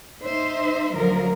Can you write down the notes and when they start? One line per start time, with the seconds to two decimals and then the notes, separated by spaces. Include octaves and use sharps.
0.23 D#4 C5 E5
0.95 D2 F3 F#3 A#4